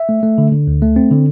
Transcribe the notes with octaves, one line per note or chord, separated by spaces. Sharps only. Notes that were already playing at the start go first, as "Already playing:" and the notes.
Already playing: E5
A3
A3
D3
D3
D2
A3
C4
D3